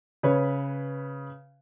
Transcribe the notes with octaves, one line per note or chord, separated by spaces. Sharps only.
C#3 B4 C#5